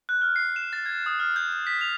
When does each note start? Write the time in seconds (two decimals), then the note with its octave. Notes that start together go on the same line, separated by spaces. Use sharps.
0.09 F#6
0.21 F6
0.36 C7
0.56 E7
0.73 A6
0.86 G#6
1.06 D#6
1.20 F6
1.36 G6
1.52 G6
1.67 B6
1.81 F7